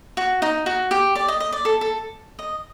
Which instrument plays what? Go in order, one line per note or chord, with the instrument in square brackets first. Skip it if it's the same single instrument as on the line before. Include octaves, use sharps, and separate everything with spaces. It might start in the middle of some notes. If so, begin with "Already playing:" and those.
[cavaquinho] F#4
D#4
F#4
G4
D5
D#5
D#5
D5
A4
A4
D#5